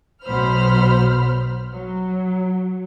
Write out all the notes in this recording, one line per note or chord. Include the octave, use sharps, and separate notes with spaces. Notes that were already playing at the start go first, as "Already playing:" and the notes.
B1 B2 F#3 C5 B5 F6
F#3